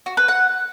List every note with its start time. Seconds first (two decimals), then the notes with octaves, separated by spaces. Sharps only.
0.06 F#4
0.17 B4
0.28 F#5